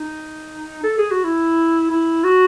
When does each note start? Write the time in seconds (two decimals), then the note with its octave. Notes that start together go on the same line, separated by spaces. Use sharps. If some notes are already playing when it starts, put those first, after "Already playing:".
Already playing: D#4
0.84 A4
0.98 G#4
1.11 F#4
1.24 E4
1.91 E4
2.24 F#4